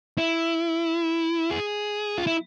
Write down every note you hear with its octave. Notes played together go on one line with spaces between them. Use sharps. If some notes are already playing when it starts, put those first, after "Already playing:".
E4
G#4
F4
E4